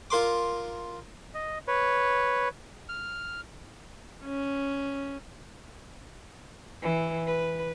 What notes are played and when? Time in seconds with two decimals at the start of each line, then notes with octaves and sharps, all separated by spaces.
0.10 F4 A#4 C6 D6
1.34 D#5
1.67 B4 C#5
2.89 F6
4.25 C#4
6.82 E3
7.27 B4